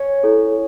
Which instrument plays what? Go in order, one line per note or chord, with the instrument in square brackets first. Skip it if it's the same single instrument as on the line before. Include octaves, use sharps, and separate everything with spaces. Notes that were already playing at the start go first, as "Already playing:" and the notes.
Already playing: [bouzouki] C#4
[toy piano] E4 A4 C#5